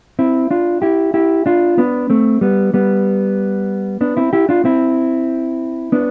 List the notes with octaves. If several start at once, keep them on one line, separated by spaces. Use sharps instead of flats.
C4 E4
D4 F4
E4 G4
E4 G4
D4 F4
B3 D4
A3 C4
G3 B3
G3 B3
B3 D4
C4 E4
E4 G4
D4 F4
C4 E4
B3 D4